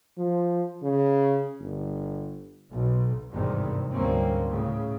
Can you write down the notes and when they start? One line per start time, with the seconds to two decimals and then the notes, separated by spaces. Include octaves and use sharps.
0.18 F3
0.83 C#3
1.61 G1
2.71 B1
3.32 G#1 E2 G2 C3 D#3
3.91 D2 G#2 G3 A#3 C4 C#4
4.47 A2 C#3